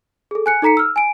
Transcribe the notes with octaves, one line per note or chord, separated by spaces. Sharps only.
G#4 A4
G#5 F#6 C#7
D#4 A4 A#5 B6 C#7
E6 F6
G#5 D7